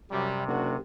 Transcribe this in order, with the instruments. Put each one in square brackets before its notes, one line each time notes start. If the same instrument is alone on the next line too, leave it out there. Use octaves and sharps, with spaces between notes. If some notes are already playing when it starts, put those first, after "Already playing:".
[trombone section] F#2 G3 [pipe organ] C3
[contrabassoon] F#1 [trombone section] D4 F#4